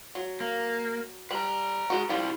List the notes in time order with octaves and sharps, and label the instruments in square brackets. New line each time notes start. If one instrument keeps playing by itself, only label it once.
[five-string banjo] F#3
[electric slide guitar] A#3
[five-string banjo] G3 [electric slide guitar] B4 A#5
[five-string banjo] G#3 D#4 F#4
[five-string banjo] F3 G3 [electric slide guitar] E4 F#4 G4